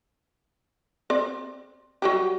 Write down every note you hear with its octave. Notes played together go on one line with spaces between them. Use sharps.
C4 D5
F#3 G3 G4